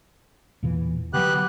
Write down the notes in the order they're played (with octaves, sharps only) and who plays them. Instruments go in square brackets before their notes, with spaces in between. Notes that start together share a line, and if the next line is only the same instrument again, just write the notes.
[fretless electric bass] E2 A#2 E3
[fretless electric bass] D3 F#3 [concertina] B3 G4 F#6